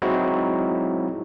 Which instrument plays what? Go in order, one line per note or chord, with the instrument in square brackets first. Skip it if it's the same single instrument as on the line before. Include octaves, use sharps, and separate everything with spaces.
[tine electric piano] F#3 G#3 C4 D#4 E4 F#4